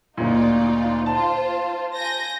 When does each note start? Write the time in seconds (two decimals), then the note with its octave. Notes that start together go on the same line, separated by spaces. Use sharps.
0.17 D2 A#2 D#4 F4 D5
1.06 F4 C5 A5
1.94 G#5 G6 A#6